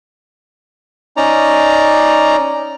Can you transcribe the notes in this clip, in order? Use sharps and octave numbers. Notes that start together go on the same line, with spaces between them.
C#4 D#4 D5 A#5